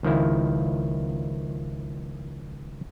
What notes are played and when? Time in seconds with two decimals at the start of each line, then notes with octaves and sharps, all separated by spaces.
0.03 C#2 D#3 F3 E4